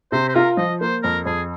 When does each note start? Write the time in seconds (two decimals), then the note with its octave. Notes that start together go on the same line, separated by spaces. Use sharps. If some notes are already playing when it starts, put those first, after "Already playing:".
0.12 C3 C5
0.28 C5
0.34 F4 A#4
0.57 F3 D#5
0.81 A#3 C5
1.03 F2 A#4
1.26 F2 G#4